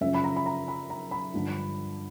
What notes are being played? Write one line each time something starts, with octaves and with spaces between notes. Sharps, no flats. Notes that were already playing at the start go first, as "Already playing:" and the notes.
F#2 C#3 F3 E5
B5
A#5
B5
A#5
B5
A#5
B5
G2 D3 F3